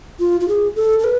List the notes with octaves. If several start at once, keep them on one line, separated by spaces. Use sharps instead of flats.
F4
F4
G#4
A4
A4
B4